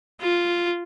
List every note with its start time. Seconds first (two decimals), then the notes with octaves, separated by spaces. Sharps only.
0.21 F4